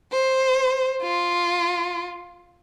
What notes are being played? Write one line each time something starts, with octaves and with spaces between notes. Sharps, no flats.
C5
F4